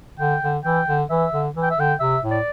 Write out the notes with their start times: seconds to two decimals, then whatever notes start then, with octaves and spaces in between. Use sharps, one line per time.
0.19 D3 G5
0.42 D3
0.64 E3 G5
0.87 D3
1.10 E3 E5
1.32 D3
1.55 E3
1.63 G5
1.71 E5
1.77 D3 G5
2.00 C3 E5
2.23 A2
2.31 D5